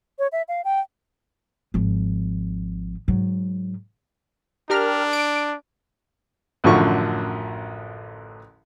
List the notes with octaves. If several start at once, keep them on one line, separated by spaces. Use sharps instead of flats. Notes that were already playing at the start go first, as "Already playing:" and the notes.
C#5
E5
F5
G5
G#1 F3
G#2 F#3
D4 G4 A#4 F6
D7
A1 F#2 D3 F3 C#6